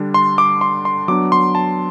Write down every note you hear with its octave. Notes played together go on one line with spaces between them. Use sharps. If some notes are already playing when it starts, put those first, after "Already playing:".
Already playing: D3 G3 D4
C6
D6
C6
C6
F#3 B3 D4 D6
C6
A5